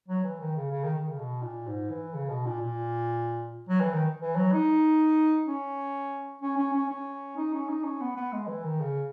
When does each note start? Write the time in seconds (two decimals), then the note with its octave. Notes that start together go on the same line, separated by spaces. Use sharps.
0.08 F#3
0.24 E3
0.40 D#3
0.56 C#3
0.72 C#3
0.84 D#3
0.95 D#3
1.08 C#3
1.19 B2
1.42 A#2
1.67 G#2
1.90 E3
2.14 C#3
2.30 B2
2.47 A#2
2.62 A#2
3.69 F#3
3.81 E3
3.93 D#3
4.21 E3
4.36 F#3
4.53 D#4
5.47 C#4
6.42 C#4
6.58 C#4
6.73 C#4
6.89 C#4
7.37 D#4
7.54 C#4
7.69 D#4
7.85 C#4
8.01 B3
8.17 B3
8.33 G#3
8.48 E3
8.65 D#3
8.80 C#3